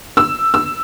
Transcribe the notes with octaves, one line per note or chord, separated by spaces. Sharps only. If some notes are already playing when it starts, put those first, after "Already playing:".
E6
E6